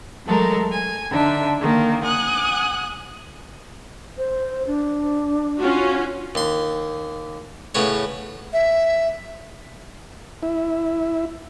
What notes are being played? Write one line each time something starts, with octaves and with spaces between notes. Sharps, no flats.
E3 F#3 G#3 A3 A4 A#4
G#5
D3 D4 D#4 E5
D3 D#3 A#3
F#5 G#5 D#6 F#6
C5
D4
C#4 F4 F#4
D#2 C6
A2 C#3 B3 C#5
E5
E4